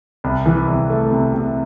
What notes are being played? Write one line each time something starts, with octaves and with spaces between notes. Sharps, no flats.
C2
E3
C2
A3
C3
C3